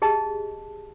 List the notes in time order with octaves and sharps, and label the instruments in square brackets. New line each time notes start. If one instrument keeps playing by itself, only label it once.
[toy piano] G4 G#4 D#5 A5